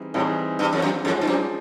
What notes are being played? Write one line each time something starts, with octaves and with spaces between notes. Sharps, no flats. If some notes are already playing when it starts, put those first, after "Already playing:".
Already playing: E3 G3 C4 D#4 G#4
A2 E3 G3 C4 D#4 G#4
G2
F2
F#2
F2 F3 G#3 C#4
G2
F#2